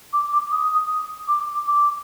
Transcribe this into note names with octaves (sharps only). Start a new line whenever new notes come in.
D6
D6
D#6
D6
D6